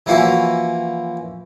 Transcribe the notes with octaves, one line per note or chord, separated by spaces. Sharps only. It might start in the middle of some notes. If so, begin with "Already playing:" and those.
E3 F3 A#3 C#4 E4 F#4